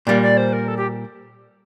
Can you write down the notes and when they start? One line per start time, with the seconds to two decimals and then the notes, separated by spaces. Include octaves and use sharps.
0.07 A#2 G3 A#3 D5
0.22 D5
0.37 C5
0.53 A#4
0.68 A4
0.77 G4